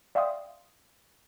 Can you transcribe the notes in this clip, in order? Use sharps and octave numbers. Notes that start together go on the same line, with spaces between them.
D5 E5 F5 G5 C6 D#6